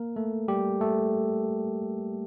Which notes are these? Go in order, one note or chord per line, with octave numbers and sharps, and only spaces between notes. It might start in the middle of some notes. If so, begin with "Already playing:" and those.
Already playing: A#3 A#4
A3 A4
G3 G4
A3 A4